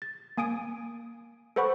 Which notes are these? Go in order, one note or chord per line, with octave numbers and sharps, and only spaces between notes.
A6
A#3 G#5 D#6 D7
A4 B4 C5 F#5 B5 C#6